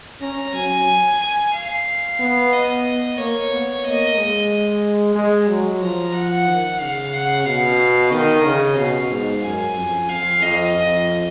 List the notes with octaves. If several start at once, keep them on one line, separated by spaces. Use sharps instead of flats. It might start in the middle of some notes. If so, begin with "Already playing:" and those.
C#4 A#5
F#3 G#5
G#5
F5
B3
D#5
A#3 C#5
B3
A#3 D#5
G#3
G#3
F#3
F3 A#5
F#5
D#3
C#3 F5
F#5
B2 F5
D#3 D#5
C#3
B2 F5
G#2
F#2 G#5
F2
F2 F5
F2 D#5
F2